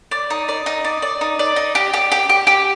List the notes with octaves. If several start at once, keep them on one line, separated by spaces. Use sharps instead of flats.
D5
D#4
D5
D#4
D5
D5
D#4
D5
D#4
G4
G4
G4
G4
G4